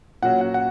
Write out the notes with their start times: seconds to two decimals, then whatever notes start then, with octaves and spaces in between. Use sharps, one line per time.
0.22 A#2 F#3 C#4 F#4 F#5
0.41 F#5
0.54 F#5